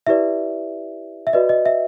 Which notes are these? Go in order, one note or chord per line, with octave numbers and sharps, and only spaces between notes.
E4 G4 B4 D5 E5
E5
F#4 B4 D5 D#5
D#5
E5